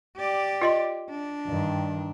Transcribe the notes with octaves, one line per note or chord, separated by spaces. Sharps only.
G4 D5
F4 D#5 C6
D4
G2 D#3